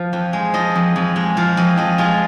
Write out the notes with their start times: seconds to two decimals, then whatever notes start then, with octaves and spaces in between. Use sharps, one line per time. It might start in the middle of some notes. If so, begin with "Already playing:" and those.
Already playing: F3 F5
0.13 F2
0.33 G#3
0.54 F3 D#5
0.75 F2
0.96 F2
1.16 G#3
1.37 F3 F5
1.57 F2 D#5
1.77 F2 D#5
1.98 G#3 F4